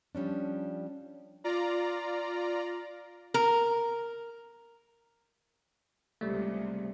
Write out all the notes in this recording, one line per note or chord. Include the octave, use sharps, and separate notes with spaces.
F3 G3 C#4 D4
F4 D5 A#5
A#4
C#2 C3 G3 A3